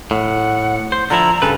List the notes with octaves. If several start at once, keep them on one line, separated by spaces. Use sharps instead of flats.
A2 F#5
C5
D3 F3 E4 A#5
G2 C#3 A4 B4